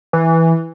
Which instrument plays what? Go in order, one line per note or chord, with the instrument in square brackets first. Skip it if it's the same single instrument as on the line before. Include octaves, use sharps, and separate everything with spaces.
[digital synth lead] E3